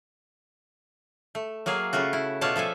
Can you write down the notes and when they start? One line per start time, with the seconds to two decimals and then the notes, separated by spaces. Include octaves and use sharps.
1.35 A3
1.66 F#3 A#3 G#4 F5
1.93 C#3 A3 F4 F#4
2.13 E4
2.41 B2 A3 F4 C#5 D5 A5
2.56 F3 A4 E5 G#5